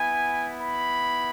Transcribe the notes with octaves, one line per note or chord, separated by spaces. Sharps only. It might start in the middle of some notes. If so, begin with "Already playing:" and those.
Already playing: B3 E4 G#5
B5